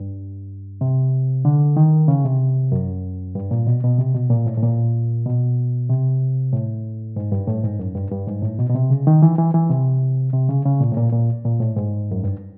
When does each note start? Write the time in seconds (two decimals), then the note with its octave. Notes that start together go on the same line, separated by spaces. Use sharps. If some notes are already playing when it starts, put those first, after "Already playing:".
Already playing: G2
0.81 C3
1.45 D3
1.77 D#3
2.08 C#3
2.25 C3
2.72 F#2
3.35 G2
3.51 A#2
3.67 B2
3.83 B2
3.99 C3
4.15 B2
4.30 A#2
4.46 A2
4.57 A2
4.62 A#2
5.26 B2
5.89 C3
6.52 A2
7.16 G#2
7.32 G2
7.47 A2
7.64 G#2
7.79 F#2
7.95 G2
8.11 G2
8.27 G#2
8.42 A2
8.59 B2
8.70 B2
8.75 C3
8.90 C#3
9.07 D#3
9.22 E3
9.38 E3
9.54 E3
9.70 C3
10.33 C3
10.49 C#3
10.65 C#3
10.80 A#2
10.92 A2
10.97 A#2
11.12 A#2
11.45 A#2
11.61 A2
11.76 G#2
12.11 F#2
12.24 G2